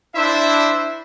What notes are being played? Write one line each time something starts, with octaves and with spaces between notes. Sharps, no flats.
D4 E4 C5 E5